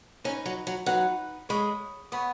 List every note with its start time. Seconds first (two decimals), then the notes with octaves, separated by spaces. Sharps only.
0.24 C#4 D#4 B4 G#5
0.46 F#3
0.67 F#3
0.86 F#3 D#4 B4 F#5
1.49 G#3 C#5 B5 D#6
2.12 B3 C#5 B5 D#6